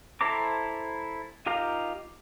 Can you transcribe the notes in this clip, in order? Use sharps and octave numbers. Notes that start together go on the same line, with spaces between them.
E4 A4 C5 A#5 D6
D#4 F4 G4 A#4 F5